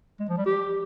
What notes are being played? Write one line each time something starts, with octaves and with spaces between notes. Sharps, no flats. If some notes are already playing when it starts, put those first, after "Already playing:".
G#3
F3
G3
G4